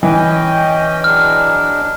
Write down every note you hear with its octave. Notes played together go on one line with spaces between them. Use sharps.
E3 C#4 D#5 G5
F#3 G#3 D4 F6